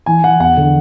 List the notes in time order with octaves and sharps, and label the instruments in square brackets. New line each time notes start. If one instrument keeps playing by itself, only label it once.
[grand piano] E3 G#5
E3 F#5
E2 F#5
D3